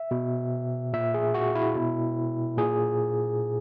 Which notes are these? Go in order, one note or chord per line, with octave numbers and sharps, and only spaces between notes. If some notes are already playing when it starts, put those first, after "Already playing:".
Already playing: E5
B2
A#2 E5
G#4
F#4
E4
B2
A#2 G#4